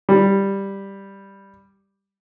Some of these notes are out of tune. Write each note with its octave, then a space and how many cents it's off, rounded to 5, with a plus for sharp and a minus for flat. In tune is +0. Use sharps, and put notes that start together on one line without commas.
G3 +5